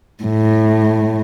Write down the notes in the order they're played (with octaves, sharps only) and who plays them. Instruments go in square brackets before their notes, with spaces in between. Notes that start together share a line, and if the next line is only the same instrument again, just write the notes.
[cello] A2